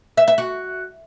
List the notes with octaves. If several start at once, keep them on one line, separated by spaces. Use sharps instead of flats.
E5
E5
F#4